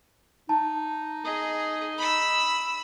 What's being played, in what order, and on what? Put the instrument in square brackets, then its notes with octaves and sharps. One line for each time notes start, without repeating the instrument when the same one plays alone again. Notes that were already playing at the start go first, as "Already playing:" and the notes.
[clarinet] D#4 [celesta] A5
[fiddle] G#4 [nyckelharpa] D#5
[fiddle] B5 E6